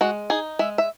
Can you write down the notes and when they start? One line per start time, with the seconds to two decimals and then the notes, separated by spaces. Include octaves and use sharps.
0.01 G#3 F#4
0.30 D#4 G#4
0.59 G#3 E5
0.78 E5